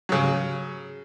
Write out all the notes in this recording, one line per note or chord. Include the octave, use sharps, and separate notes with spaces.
C#3 F#3